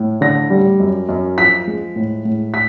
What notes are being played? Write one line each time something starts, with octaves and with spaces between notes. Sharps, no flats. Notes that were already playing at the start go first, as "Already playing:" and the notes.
Already playing: A2
D3 A#6
G3
F#2
F#2
F3 B6
G#3
A2
A2
B6